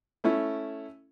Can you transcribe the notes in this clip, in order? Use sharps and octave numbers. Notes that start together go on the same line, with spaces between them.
A3 C#4 E4